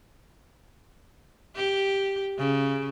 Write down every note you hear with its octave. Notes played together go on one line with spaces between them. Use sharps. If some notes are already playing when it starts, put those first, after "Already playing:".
G4
C#3